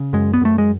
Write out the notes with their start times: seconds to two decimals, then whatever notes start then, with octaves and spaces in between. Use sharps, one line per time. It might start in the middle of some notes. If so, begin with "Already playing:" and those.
Already playing: C#3
0.13 F#2 G#3
0.34 B3
0.41 F#2 A3
0.58 G#3